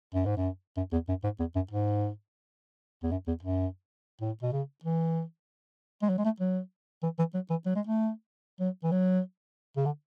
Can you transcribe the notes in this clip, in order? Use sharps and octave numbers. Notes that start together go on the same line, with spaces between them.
F#2
G#2
F#2
F#2
E2
F#2
G#2
E2
F#2
G#2
E2
F#2
E2
F#2
A2
B2
C#3
E3
G#3
F#3
G#3
A3
F#3
E3
E3
F#3
E3
F#3
G#3
A3
F#3
E3
F#3
C#3
D3